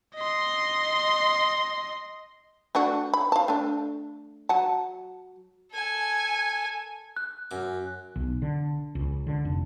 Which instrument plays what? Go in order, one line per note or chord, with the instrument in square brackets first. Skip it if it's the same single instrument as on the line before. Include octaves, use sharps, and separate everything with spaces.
[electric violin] D#5 C6
[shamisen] A3 D4 F#4
B5
F5 A5
A3 D4
F#3 F#5 A5
[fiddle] A4 G#5
[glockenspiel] F#6
[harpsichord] F#2 D6
[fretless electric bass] B1
D3
C#2
D3
F1